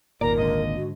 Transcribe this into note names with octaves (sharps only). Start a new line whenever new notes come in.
G#1 D#2 A#2 A#4 D5 A#5
G#2 D3 D#5
F#4